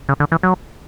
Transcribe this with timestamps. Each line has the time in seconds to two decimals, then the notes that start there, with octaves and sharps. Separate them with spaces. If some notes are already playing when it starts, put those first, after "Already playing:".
0.09 C#3
0.20 D3
0.32 E3
0.43 F#3